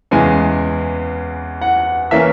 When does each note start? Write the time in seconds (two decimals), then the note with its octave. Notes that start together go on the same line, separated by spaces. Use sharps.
0.11 E2 C#3 E3 G#3 G#5
1.61 F#5
2.11 E3 A#3 C#4 E5